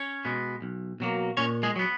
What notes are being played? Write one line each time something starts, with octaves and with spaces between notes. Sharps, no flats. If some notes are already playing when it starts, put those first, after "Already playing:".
Already playing: C#4 C#5
B2 G#3 B3
B1
B2 F#3 A#3
A#2 C#4 C#5
G#3 G#4
F#3
B3